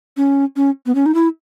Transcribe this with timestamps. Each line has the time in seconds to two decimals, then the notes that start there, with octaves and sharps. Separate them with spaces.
0.17 C#4
0.56 C#4
0.86 B3
0.95 C#4
1.06 D#4
1.15 E4